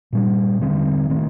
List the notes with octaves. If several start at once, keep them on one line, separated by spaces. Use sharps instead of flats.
A#2 G3 D4
D3 G3 C4
D#3 A3 C4